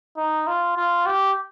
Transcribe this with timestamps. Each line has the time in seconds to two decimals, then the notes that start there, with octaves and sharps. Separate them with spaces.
0.17 D#4
0.47 F4
0.77 F4
1.06 G4